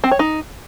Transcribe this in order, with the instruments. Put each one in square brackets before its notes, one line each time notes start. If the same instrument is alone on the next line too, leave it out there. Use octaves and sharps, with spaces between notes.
[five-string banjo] C4
C#5
D#4